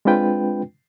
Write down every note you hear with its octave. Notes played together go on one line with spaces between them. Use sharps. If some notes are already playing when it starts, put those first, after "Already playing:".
G#3 C4 D4 F4 B4 G5